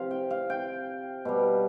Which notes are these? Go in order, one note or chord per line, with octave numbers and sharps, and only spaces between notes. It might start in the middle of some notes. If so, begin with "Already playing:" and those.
Already playing: C3 F3 F5
G5
F5
G5
B2 G3